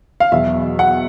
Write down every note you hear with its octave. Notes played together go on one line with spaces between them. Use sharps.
F5
E2 B2 F#3 E5
F#5